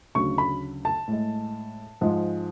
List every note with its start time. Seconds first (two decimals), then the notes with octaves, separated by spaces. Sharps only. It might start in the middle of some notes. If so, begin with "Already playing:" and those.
0.15 D2 C#3 F#3 C#6
0.38 B5
0.85 A5
1.08 A2 G#3
2.01 G#2 F3 G#3